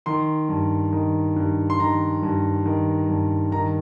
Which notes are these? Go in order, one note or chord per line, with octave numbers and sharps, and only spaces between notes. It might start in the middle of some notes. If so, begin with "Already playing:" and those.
D#3 C6
G2
D#3
G2
C6
D#3 A#5
G2
D#3
G2
D#3 A#5